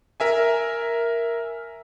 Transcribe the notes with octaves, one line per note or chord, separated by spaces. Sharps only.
A#4 E5 G#5